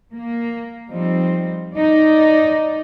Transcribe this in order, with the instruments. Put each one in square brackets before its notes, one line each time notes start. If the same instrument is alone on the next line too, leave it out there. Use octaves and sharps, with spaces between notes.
[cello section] A#3
F3 G3 C4 D#4
D#4 D5